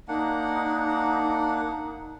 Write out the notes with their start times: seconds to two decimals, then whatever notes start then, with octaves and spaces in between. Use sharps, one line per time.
0.08 A#3 D4 D#4 F#5